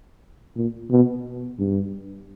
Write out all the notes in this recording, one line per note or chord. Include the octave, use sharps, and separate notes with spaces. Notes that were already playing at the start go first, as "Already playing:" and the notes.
A#2
B2
G2